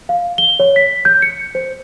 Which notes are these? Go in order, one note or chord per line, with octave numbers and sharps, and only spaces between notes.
F5
G7
C#5
B6
G6
C#7
C5